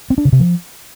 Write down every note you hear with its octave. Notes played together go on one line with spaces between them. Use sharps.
C4
D4
C#3
C3
F3